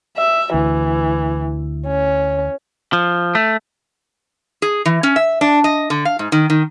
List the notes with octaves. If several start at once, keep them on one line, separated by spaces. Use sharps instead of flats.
E5
D2 E3
C#4
F3
A3
G#4
E3
C#4
E5
D4
D#5
D3
F5
G#2
D#3
D#3